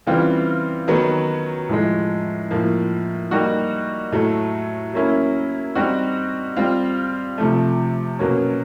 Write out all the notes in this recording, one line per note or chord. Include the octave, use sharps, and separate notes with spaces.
C#3 E3 G3 C4 F4
D#3 F#3 B3
A2 F3 G#3
A2 F3 A#3
G3 A#3 D#4 F#4
A2 F#3 A3
F#3 A#3 C#4 E4
G3 C4 D#4 F#4
G3 C4 F4
C3 F3 A3
B2 F#3 A#3 C#4